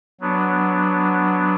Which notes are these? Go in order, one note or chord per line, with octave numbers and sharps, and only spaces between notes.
F#3 B3 D4